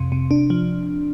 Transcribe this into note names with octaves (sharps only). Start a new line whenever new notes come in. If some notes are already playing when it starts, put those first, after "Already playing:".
Already playing: F2 C3
C3
D4
F3